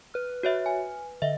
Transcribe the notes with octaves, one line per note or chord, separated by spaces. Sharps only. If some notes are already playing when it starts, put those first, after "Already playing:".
B4 F6
F#4 C#5 E5
G#5
D3 D#5 E5